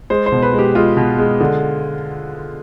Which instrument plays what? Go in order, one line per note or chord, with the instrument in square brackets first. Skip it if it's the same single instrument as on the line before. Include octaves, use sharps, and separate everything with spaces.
[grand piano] G#3 C5
C5
B2
B4
G#3
G4
G#3 F4
B2
G#3
D3